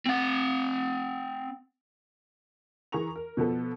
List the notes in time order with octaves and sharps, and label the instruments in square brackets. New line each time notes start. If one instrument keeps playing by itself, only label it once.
[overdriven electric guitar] C4 F#5
[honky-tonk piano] E3 G#4 A#4 A#5 C#6 F7
A#4
B2 F3 B3 A4